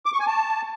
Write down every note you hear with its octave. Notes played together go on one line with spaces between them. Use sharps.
D6
C#6
G#5
A5